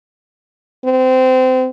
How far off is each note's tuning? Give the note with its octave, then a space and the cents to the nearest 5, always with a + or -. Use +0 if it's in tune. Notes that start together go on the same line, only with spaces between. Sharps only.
C4 -25